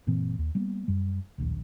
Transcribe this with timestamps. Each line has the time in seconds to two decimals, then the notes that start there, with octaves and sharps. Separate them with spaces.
0.07 F#1 A#2 E3 C4
0.38 D#2
0.55 G3 A#3 B3
0.88 F#2 G3
1.38 D1 A#1 D#2